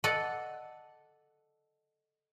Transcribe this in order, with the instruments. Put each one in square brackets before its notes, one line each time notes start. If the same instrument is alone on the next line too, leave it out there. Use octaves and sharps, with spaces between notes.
[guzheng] A4 D5 D#5 F#5